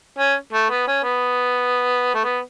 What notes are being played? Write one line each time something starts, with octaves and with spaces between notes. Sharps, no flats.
C#4
A3
B3
C#4
B3
A3
B3